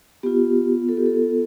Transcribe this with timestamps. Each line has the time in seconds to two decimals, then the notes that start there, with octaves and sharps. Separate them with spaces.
0.23 B3 F4 G4
0.89 A4
0.97 G4
1.06 A4